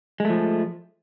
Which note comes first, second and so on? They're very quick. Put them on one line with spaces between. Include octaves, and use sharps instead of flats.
G#3 A3 F3